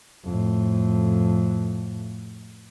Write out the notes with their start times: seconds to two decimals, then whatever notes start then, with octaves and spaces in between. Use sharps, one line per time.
0.24 F2 A2